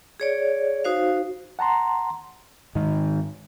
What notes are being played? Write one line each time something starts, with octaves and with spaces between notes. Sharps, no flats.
G#4 C#5 D5
D#4 F#4 C5 F5
F#5 A5 A#5 C6
G#2 D#3